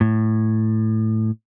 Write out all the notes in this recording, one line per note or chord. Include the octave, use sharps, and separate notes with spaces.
A2